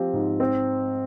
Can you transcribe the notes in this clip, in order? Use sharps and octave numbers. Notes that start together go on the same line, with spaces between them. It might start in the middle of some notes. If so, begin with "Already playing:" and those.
Already playing: F3 C4 G4
G#2
C4